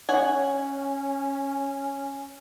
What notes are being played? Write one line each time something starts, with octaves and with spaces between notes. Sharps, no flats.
C#4 C#5 F#5 G#5